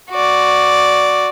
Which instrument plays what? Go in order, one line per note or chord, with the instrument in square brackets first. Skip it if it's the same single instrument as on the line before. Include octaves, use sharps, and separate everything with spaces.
[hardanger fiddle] F#4 D5